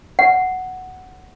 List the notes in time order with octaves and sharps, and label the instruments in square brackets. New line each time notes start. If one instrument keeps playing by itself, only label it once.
[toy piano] F#5